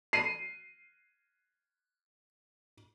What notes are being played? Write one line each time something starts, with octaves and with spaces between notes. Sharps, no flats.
C7 D#7